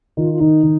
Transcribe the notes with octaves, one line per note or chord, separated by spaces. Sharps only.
D#3 F4
F4
D#3 D#4
D#3